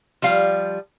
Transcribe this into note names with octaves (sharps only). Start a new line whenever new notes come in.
F3 G3 F5